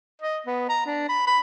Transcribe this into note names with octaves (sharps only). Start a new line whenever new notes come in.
D#5
B3
A#5
D4
B5
B5